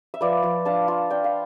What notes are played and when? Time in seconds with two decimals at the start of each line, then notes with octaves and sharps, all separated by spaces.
0.14 E5
0.21 F3 B4 D5
0.43 F3
0.65 D4 F5 A5
0.88 F4
1.10 D4 G5
1.24 F5